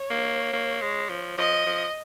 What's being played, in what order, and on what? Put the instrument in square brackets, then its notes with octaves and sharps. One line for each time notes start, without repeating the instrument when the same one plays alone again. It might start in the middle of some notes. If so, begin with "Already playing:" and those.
Already playing: [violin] C#5
[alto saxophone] A#3
A#3
G#3
F3
[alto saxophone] F3 [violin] D#5
[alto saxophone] F3